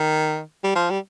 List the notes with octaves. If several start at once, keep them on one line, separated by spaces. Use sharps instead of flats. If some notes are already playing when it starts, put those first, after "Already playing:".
Already playing: D#3
G3
F3
G3